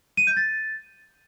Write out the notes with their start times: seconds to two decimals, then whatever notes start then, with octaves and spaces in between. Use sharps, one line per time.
0.17 D#7
0.27 G6
0.37 A6